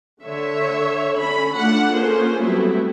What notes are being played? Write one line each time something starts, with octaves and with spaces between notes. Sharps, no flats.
D3 C#5 E5
D3 C#4 A4 B5
A3 D4 F4 F#5
A#3 C#4 F4 G#4 A4 C5
F#3 G3 A3 B3 C4 E4